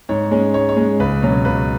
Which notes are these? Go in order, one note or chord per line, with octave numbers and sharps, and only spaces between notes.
G#2 C#5
G#3 C#4
G#2 C#5
C#5
G#3 C#4
C#2 B4
B2 F#3 C#4
C#2 B4